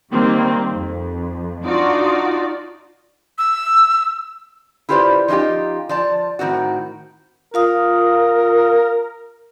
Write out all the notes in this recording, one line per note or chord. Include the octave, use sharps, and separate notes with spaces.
D#3 G3 A#3 C4
F2
D4 D#4 F4 F#4 D5
E6
E4 F4 G4 B4 C5 D5
F3 C#4 D#4 F4 G4
F3 D5 A5
A2 D#3 C4 F#4
F4 A#4 F5 D#6